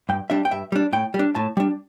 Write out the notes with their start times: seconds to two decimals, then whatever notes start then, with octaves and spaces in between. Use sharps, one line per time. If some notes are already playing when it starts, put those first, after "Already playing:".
0.09 G2 G5
0.30 G3 D4 E5
0.45 G5
0.51 G2 E5
0.72 G3 D4
0.93 A2 G5
1.14 G3
1.19 D4
1.35 A2 A5
1.57 G3 D4